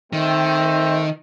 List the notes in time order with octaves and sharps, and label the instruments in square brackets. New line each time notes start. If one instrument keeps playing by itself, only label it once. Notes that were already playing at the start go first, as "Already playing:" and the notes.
[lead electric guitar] D#3 [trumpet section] A3 C4 E5